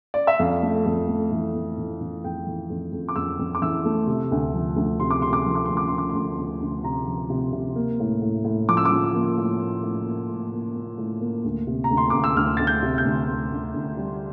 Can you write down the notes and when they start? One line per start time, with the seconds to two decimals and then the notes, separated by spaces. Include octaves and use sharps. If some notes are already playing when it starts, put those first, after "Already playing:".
0.14 D5
0.27 E5
0.39 F2 F5
0.62 A3
0.86 F2
1.08 A3
1.31 E3
1.55 A3
1.78 E3
2.01 E3
2.24 F2 G5
2.47 E3
2.70 F2
2.93 F2
3.09 D6
3.16 F2 E6
3.39 F2
3.55 D6
3.62 E3 E6
3.85 A3
4.07 C3
4.31 D2
4.54 F3
4.76 D2
5.00 C3 C6
5.11 D6
5.22 C3 C6
5.33 D6
5.44 F3 C6
5.55 D6
5.65 D2 C6
5.77 D6
5.88 D2 C6
5.98 D6
6.10 C6
6.15 D2
6.38 D2
6.61 D2
6.84 C3 A#5
7.08 F3
7.30 C3
7.52 C3
7.76 A#3
8.00 A2
8.21 A2
8.45 A2
8.69 F3 D6
8.77 E6
8.85 D6
8.91 F3
9.14 A#3
9.37 A2
9.61 A#3
9.83 A2
10.06 A#3
10.30 A2
10.52 A#3
10.75 A#3
10.98 A2
11.21 A#3
11.44 D2
11.67 C3
11.84 A#5
11.91 D2
11.97 C6
12.10 D2 D6
12.24 E6
12.36 D2 F6
12.57 D2 A6
12.67 G6
12.83 C3
12.98 G6
13.05 D2
13.28 D2
13.52 D2
13.74 D2
13.97 G3